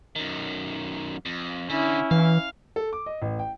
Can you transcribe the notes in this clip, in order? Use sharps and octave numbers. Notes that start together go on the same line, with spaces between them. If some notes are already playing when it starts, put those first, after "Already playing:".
F#2 D#3
F2
D3 C#4 E4
E3 F5
A4
D6
D#5
A1
G5